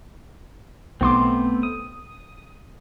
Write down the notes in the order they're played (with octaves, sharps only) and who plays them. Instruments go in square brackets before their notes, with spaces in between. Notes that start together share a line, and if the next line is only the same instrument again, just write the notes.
[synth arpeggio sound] B1 C6 D6 [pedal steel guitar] A3 B3 C4
[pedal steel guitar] D#6